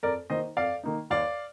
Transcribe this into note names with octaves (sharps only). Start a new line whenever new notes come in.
F2 A#4 D5
D#3 A#3 D#4 C5 D#5
F2 D5 F5
D#3 A#3 D#4
D#2 D5 F5